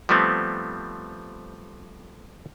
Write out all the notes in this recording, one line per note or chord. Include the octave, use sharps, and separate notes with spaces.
F3 G3 A3 B3 C4